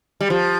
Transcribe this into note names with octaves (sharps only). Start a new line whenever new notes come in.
G3
F3